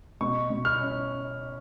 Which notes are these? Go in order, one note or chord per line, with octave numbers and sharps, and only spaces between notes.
B2 C#6
B2
F6
C#4